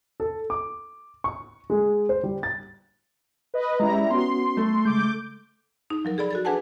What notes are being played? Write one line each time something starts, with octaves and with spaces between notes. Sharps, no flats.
A4
D6
C#6
G#3
C5
G3
A6
B4 D#5
G3 G#3 C#4 E4 A#5
B3 C#4 F#4 C6
A3
C#3 G#3 D6 G6
D#4
F3 F#3 A#4
G#4 A4 D5 B5
F#4 A4 A6
D4 G#4 B4 F#5 G#5 A5